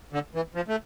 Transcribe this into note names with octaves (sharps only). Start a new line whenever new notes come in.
D3
E3
F3
A3